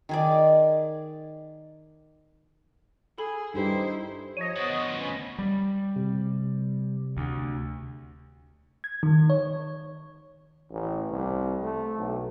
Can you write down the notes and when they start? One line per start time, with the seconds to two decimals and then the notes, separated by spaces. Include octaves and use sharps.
0.09 D#3 G#4 D5
3.18 G#4 A4 B5
3.55 G2 D#4 E4 G4 A4 C5
4.37 F3 C#5 D#5 A#6 D#7
4.56 B3 D4 F#4
4.70 D2 F3
5.00 C#4 B5
5.38 G3
5.96 C3
7.17 D2
8.84 G#6
9.03 D#3
9.30 C#5
10.71 A1
11.10 C2
11.63 A3
11.98 B1